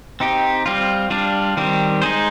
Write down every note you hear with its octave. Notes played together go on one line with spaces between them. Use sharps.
C4 D#4 G4
G3 C4 F4
G3 D4 F4
D#3 G3 C4
G#3 D#4 G#4 C5